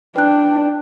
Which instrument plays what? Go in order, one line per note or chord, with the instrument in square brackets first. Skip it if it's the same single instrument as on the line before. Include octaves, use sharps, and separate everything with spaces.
[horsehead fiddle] D4 [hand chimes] B4 F#6 [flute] G5